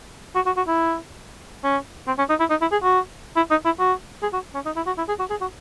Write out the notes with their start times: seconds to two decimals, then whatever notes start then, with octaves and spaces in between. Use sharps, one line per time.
0.35 F#4
0.46 F#4
0.57 F#4
0.68 E4
1.64 C#4
2.07 C4
2.18 C#4
2.30 D#4
2.40 E4
2.50 D#4
2.61 E4
2.72 G#4
2.83 F#4
3.36 E4
3.51 D#4
3.65 E4
3.80 F#4
4.23 G#4
4.33 F#4
4.55 C#4
4.66 D#4
4.76 E4
4.87 F#4
4.98 E4
5.08 G#4
5.19 F#4
5.30 G#4
5.41 F#4